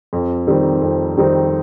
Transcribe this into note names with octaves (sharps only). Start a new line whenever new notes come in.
F2
D#3 G3 C4 D#4
F2
D#3 G3 C4 D#4